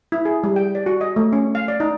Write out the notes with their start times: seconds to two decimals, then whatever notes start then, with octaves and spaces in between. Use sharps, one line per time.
0.12 E4
0.25 G#4
0.44 G3
0.56 G5
0.75 D5
0.86 F#4
1.01 D#5
1.16 A3
1.33 C#4
1.55 F5
1.68 D5
1.80 D#4